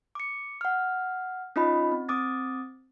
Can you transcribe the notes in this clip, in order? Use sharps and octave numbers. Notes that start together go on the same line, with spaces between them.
D6 C#7
F#5 F6
C#4 D#4 F4 D#5 B5
C4
C4 D6 D#6 A6